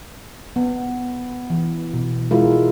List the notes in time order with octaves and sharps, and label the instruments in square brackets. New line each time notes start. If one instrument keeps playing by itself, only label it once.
[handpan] B3
E3
B2
G#3 E4 F4 A#4